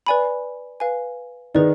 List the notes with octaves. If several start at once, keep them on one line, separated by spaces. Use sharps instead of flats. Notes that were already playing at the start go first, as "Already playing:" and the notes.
B4 D5 G#5 B5
B4 F5 G#5
D#3 D#4 G#4 B4 D5